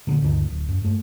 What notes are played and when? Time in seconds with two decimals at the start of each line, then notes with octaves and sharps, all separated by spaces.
0.07 A#2 D3
0.22 D2 G2 D3 D#3
0.50 D1
0.68 F#2
0.82 G2 A3